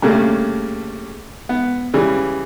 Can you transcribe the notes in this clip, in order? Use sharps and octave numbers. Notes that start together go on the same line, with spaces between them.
G2 C#3 A3 A#3
B3
C#3 E3 G3